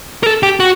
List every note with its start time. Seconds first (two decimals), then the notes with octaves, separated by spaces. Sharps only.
0.23 A#4
0.27 A4
0.43 G4
0.60 F#4